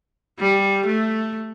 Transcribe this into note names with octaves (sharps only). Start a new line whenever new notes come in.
G3
A3